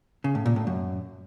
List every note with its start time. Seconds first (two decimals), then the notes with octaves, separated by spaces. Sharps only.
0.24 C#3
0.35 A2
0.46 A#2
0.56 A2
0.67 F#2